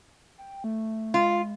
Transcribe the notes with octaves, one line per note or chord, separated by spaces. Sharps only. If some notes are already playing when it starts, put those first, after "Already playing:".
G5
A3
G#3 F4